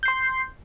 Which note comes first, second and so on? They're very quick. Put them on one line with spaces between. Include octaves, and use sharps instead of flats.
G6 C7 C6